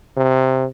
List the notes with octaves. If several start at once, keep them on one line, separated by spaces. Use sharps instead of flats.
C3